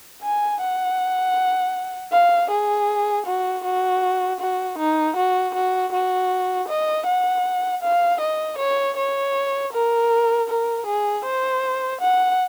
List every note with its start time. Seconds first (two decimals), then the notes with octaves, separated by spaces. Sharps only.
0.22 G#5
0.61 F#5
2.12 F5
2.50 G#4
3.26 F#4
3.64 F#4
4.41 F#4
4.78 D#4
5.16 F#4
5.55 F#4
5.93 F#4
6.68 D#5
7.06 F#5
7.82 F5
8.21 D#5
8.59 C#5
8.97 C#5
9.73 A#4
10.49 A#4
10.86 G#4
11.25 C5
12.01 F#5